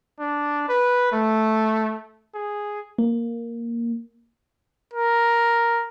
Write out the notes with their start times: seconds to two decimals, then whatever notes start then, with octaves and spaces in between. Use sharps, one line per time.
0.20 D4
0.69 B4
1.12 A3
2.35 G#4
2.98 A#3
4.93 A#4